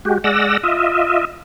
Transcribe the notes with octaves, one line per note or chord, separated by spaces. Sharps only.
G#3 F#4 G4
G#3 D5 F#5 E6 A#6
F4 D#5 E5